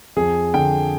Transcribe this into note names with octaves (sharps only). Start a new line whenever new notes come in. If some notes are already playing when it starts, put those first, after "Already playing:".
F2 G#4
D3 G5